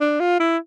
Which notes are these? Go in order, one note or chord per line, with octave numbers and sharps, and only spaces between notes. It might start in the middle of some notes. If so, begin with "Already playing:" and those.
D4
F4
E4